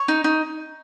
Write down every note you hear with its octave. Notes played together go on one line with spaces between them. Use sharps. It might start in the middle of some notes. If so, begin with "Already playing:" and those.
Already playing: C#5
D#4
D#4